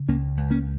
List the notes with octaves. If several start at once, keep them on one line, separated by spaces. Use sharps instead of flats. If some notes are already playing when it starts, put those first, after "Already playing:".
Already playing: C#3
C#2 A#3 C#4
C#2
A#3 C#4